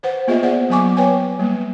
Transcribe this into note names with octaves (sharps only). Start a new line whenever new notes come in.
B4 C5 F#5
A#3 B3 F4 G#4 D#5 E5
C5 D5 F#5
F#3 B3 G#5 C#6 D6
B4 C#5 G5 G#5
G3 A#3